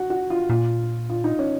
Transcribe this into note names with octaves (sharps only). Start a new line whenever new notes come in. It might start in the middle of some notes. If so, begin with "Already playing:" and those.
Already playing: F#4
F#4
F4
A#2 F4
F4
D#4
C#4